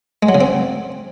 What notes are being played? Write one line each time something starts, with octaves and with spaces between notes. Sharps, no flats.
G#3
F#3
C#3
C4